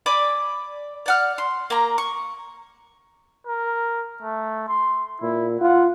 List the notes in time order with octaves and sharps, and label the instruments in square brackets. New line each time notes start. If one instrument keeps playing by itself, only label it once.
[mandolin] D5 G#5 B5 D6
D5 F#5 F6
C6
A#3 A#5
C#6
[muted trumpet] A#4
A3
C6
[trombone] A#2 [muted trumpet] E4
[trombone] F4 [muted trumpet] F#5